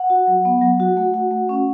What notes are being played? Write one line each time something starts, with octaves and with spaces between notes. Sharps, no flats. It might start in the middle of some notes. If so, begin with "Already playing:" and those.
Already playing: F#5
F#4
F#3
B3
F#3
F#4
A3
F#4
A3
C#4